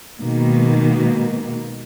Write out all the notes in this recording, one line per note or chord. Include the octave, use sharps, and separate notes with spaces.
B2 D#3 G#3 A#3